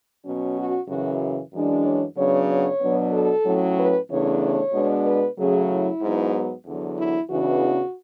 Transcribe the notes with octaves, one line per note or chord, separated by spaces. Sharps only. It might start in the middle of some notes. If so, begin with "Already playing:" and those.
B2 F#3 C#4
F#4
F#2 C#3 E3 F#4
F#2 E3 G#3 D4
C#5
C#3 F#3 B3 D4 C#5
C#5
B2 F#3 B3 D4
A4
A2 F#3 C#4
B4
E2 C#3 E3 A3 D4 C#5
C#5
B2 G#3 B3 D4
B4
C#3 F#3 A3 C#4 G#4
E4
G#2 F#3 B3
E2 D3 F#3
E4
E2 C#3 E3 B3 D4 F#4